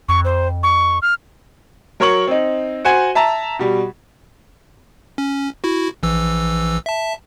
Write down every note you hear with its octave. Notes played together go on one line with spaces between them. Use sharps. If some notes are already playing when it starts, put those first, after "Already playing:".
F2 C#6
C5
C#6
F6
F#3 A#4 C#5 C#6 F#7
C4 D#4
F#4 C5 F#5 G#5
E5 A5 A#5
B2 G3
C#4
E4 F#4
A#1 E3 E6
E5 A5